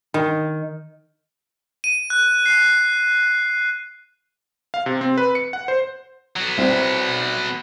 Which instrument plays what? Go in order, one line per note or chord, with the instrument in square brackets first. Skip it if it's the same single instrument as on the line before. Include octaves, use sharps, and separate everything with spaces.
[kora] D#3
[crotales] D#7
F#6
C7
[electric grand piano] F5
C3
C4
B4
C#7
F#5
C5
[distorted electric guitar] F#3 B3
[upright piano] C2 C4